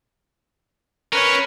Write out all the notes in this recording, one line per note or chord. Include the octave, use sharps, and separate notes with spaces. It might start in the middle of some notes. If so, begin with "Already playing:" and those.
C#4 A#4 B4 C#5